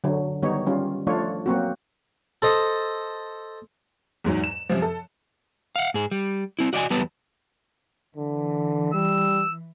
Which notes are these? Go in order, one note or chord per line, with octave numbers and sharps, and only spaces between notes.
D3 F#3
D#3 G3 B3 D#4 C#5
G3 C#4 F4
F3 A3 D4 F4 C#5
F#3 A#3 C4 F#4
A4 C5 D#5
E2 G#2 F#3
E7
F#2 C3 F3
A4
F5 F#5
G#2 G#4
G3
C4 E4
F#4 D5 D#5 F#5 G#5
E2 F#3 G3 B3 B4 A5
D3 E3
G3 E6